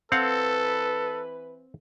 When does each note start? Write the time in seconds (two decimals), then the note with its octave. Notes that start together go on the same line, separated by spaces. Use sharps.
0.12 E3 C4 A4 B4 F5 F#5